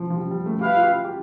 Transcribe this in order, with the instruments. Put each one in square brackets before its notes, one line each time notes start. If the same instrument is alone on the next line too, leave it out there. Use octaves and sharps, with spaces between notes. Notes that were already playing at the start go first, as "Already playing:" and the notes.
Already playing: [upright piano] F3
F3
G3
G3
A3
[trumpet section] E4 B4 F5 [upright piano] G4
[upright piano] F4
G4
G4